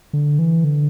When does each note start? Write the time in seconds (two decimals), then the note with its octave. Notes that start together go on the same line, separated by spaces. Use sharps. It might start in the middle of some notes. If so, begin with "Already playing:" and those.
0.13 D3
0.39 E3
0.64 D3